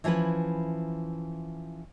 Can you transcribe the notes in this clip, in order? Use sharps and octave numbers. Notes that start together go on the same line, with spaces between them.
E3 F3 C#4 E4 B4